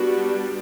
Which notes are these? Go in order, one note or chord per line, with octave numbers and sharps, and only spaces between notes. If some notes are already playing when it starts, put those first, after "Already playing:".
Already playing: G3 B3 D4 F#4